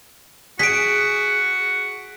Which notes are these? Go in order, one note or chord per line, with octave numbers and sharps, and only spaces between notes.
F#4 G#4 B6 D7